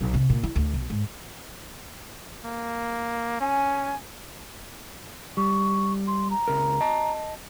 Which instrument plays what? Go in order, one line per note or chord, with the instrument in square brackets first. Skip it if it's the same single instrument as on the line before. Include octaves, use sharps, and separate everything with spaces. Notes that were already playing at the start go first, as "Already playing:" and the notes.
[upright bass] B1
C3
A#2
E4
D2
B1
G#2
[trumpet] A#3
[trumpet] C#4 [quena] G#5
[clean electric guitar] G3 [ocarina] C#6
[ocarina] C6
A#5
[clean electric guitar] C#2 A#4
D#5 A5